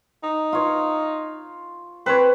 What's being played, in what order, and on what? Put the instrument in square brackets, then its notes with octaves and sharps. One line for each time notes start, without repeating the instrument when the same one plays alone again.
[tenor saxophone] D#4
[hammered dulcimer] F4 C#5
[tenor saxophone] C4 [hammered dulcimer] B4 C#5